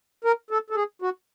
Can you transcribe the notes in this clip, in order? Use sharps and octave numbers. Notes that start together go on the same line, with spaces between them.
A#4
A4
A4
G#4
F#4